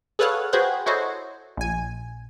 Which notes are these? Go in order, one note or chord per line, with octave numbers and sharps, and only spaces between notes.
G#4 A4 B4 C#5 F5 F#5
F#4 G#4 B4 C5 F#5 G5
E4 F#4 A4 C5 C#5 D#5
A#1 G#5